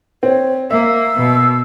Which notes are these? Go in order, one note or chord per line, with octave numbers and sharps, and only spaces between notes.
C4 C#5
A#3 E5 E6
B2